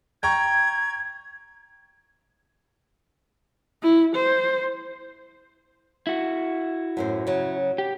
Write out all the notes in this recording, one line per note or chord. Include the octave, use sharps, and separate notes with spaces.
G5 A#5 C#6 G#6
E4
C5
E4 F#4
F#2 A2 C5
C#3 F#3
G4